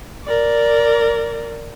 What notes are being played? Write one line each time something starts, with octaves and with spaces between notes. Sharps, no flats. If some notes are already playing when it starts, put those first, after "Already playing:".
A#4 D5